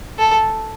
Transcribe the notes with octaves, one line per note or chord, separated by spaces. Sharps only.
A4